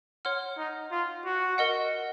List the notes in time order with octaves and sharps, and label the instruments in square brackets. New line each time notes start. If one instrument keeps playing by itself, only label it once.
[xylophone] C#5 F#5 C6 F6
[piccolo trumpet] D#4
F4
F#4
[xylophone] A#4 D#5 F#5